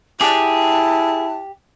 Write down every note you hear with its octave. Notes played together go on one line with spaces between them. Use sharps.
E4 G4 G#4 A5